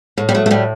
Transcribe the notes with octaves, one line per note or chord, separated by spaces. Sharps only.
A2
G3
F#3 A3
A3
A2 G3